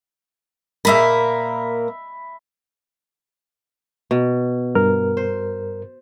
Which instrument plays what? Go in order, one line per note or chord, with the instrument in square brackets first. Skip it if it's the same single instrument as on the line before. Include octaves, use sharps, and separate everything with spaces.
[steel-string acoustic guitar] A#2 A#3 A#4 [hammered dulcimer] E5 B5
[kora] B2
[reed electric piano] G2 A#4 F6
[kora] C5